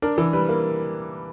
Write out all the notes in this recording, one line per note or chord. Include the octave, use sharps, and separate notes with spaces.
D4 A#4
E3
G3 B4
A#3